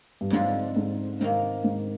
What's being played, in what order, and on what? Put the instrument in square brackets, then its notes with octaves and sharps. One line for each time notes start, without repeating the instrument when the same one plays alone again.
[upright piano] G2
[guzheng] F2 D3 G#3 D4 F4 [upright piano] G#2
[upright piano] G#2
[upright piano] G#2 [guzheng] C3 D#3 A#3
[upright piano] G#2